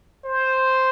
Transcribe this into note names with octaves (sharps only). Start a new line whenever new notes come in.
C5